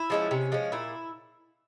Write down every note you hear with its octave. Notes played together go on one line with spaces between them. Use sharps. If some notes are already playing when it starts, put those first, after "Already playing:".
Already playing: E4
F3 G#3 C#4
C3 C#4
F3 G#3 C#4
A#2 E4